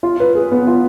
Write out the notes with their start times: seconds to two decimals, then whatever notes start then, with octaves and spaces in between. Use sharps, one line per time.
0.03 F4
0.20 B4
0.35 G#4
0.51 B3
0.67 F4